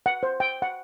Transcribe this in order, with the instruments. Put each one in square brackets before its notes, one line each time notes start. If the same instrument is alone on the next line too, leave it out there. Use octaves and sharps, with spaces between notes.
[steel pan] F#5
C5
G5
F#5